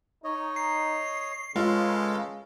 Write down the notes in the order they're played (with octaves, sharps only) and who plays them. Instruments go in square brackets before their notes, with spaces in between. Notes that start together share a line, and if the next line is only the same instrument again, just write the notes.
[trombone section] D#4 [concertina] C#5 D#5
[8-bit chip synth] C7
[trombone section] C#3 [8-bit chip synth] G#3 [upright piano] F4 [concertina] A4 B4 F5